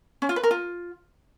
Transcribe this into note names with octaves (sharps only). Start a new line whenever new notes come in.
C#4
F4
B4
A#4
F4